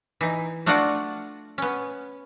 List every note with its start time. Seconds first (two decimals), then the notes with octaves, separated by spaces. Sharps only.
0.21 E3 D#4
0.66 A3 D4 F4 F#4 D5 F#5
1.58 B3 C#4